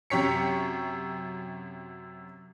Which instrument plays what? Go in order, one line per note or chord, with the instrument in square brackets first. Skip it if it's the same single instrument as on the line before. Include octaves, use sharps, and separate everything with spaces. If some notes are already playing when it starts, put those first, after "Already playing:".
[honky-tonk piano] F#2 C3 G4 C#5 B6 C#7